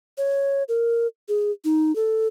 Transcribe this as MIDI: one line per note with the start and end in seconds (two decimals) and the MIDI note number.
0.18 0.63 73
0.69 1.07 70
1.29 1.51 68
1.65 1.95 63
1.96 2.28 69